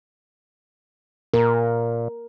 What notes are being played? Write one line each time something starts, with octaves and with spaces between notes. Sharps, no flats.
A#2 A#4